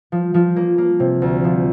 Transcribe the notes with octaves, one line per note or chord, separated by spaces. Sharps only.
F3
F3
A#3
A#3
C3
D2
F3